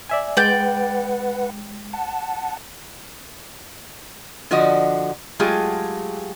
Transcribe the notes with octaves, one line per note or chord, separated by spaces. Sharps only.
D5 E5 G#5
G#3 B4 D5 F#5 G5 G6
F#5 A5
D3 F3 D4 F#4 D#5
F#3 G#3 A3 F4 G4 G#4